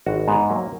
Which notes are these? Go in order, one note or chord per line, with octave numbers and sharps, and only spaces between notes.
G#1 F#4
G#2 B3
F#3 A#3